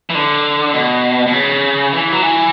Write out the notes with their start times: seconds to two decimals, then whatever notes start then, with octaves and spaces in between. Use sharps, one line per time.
0.10 E3
0.15 D3
0.74 B2
1.27 B2
1.34 C#3
1.93 E3
2.12 F#3
2.23 E3